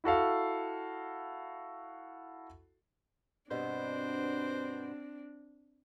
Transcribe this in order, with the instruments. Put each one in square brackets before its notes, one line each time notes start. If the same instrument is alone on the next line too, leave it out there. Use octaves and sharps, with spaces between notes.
[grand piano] E4 F#4 A4 F5
[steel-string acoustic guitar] G2 B2 B3 [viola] C4 D4 [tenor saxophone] C5